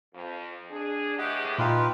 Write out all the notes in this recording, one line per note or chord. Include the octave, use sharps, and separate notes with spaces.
F2
D4 G#4
A2 E3 G4 D#5 F#5
A#2 D#4 F4 B4 G5